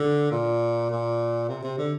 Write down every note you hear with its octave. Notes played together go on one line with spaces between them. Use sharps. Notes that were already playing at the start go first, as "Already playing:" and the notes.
Already playing: D3
A#2
A#2
C3
C3
D3